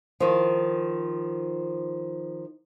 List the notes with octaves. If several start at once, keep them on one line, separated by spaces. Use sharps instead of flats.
D#3 F3